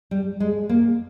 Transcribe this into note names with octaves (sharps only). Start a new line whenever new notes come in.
G3
G#3
A#3